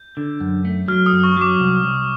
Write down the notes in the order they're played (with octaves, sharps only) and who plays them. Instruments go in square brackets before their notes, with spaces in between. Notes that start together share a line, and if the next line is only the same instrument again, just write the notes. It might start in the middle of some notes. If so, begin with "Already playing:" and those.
Already playing: [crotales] G6
[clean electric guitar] D3
F#2
A3
[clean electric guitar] F#3 [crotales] F6
[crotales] D#6
[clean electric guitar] F#2
[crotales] C#6
[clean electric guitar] F#3 [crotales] D6
[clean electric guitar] C2
C2